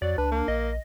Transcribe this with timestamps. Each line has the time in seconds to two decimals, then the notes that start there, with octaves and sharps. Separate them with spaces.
0.02 F2 F#3 D5
0.18 C#2 D4 B4
0.32 A#3
0.48 A#1 D#5